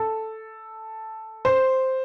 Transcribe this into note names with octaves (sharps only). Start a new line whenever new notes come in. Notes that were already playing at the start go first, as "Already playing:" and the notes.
Already playing: A4
C5